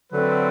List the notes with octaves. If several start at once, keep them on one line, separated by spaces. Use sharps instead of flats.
D3 F#3 A3 C4 B4